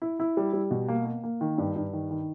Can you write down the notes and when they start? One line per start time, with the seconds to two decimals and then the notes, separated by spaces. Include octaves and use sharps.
0.02 E4
0.20 E4
0.37 G3
0.53 G3
0.71 B2
0.88 A#3
1.06 A#3
1.23 A#3
1.41 D#3
1.58 G2
1.76 G2
1.93 D#3
2.11 D#3